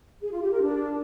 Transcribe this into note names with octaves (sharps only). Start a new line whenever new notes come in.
G#4
F4
G4
A#4
D4